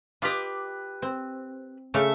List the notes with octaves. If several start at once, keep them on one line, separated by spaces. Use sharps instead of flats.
F4 G4 B4 D#5 D6
C4
C#3 A3 A4 E5 F5